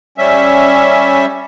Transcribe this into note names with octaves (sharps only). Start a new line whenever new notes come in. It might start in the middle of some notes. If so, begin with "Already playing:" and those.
G3 C#4 E5